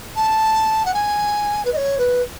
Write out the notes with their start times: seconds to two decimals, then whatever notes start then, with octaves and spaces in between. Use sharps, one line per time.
0.15 A5
0.85 F#5
0.94 G#5
1.64 B4
1.72 D#5
1.76 C#5
1.98 B4